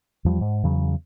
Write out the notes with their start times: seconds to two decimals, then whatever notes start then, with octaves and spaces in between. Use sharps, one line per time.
0.25 E2 F3 G3
0.41 G#2
0.63 E2 C#3 F#3